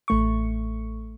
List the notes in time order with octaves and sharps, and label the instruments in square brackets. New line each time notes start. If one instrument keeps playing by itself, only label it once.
[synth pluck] A1 A3 C#6